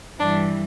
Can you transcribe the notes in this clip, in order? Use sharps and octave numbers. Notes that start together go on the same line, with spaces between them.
G2 E3 G3 D4